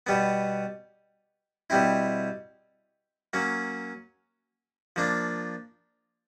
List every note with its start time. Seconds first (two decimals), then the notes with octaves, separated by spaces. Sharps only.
0.07 B2 G3 B3
1.70 B2 G3 C4 E4
3.33 F#3 A#3 C#4
4.96 F3 A#3 D4